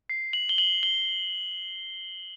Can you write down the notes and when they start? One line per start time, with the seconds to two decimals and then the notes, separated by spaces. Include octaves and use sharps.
0.10 C7
0.33 F#7
0.49 G7
0.58 F#7
0.83 G7